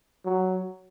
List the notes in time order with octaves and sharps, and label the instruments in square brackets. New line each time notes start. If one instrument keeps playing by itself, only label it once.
[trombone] F#3